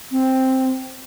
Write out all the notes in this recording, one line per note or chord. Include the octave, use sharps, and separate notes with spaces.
C4